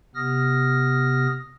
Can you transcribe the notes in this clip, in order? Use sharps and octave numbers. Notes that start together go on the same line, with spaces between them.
C3 B3 D#6 F6 A#6